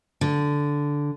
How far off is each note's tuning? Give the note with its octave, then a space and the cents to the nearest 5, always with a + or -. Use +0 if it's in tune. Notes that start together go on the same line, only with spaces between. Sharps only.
D3 -10